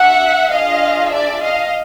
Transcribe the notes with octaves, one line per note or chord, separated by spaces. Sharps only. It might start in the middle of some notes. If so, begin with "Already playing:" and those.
Already playing: D4 F#4 E5 F#5
D4 F4 G#4 D#5 F5
D5 E5
D#5 F5